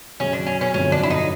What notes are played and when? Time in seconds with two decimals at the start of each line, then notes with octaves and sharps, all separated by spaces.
0.20 F#2 C#3 F#3 C#4
0.33 D4
0.46 C#4
0.61 C#4
0.74 G1 F2 D3 F#3 C#4
0.92 D4
1.03 E4
1.10 D#4